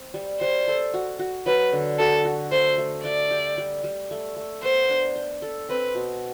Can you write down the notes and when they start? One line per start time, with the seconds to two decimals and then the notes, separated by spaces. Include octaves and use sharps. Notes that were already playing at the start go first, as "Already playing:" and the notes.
Already playing: C4
0.14 G3
0.41 G3 C5
0.68 A4
0.94 F#4
1.19 F#4
1.46 F#3 B4
1.72 D3
1.99 F#4 A4
2.25 F#4
2.52 A3 C5
2.78 A3
3.05 A3 D5
3.31 G4
3.58 G3
3.84 G3
4.11 A3
4.36 A3
4.63 B3 C5
4.90 D4
5.16 C5
5.42 A4
5.69 C4 B4
5.95 B2